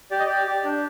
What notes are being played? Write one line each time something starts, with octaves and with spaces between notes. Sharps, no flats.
G4 D5
D#5
G4 D5
G4
D4